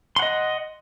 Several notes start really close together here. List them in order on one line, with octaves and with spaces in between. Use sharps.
C6 F#5 D#5